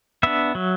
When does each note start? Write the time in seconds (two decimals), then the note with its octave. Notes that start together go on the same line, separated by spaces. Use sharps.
0.23 B3 D4 E5
0.55 F#3